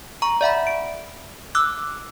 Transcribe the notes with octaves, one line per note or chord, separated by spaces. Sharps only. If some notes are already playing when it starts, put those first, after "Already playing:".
A#5 C#6
D5 E5 F#5 B5
D7
D6 E6 F#6